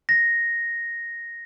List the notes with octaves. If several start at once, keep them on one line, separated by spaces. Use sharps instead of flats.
A#6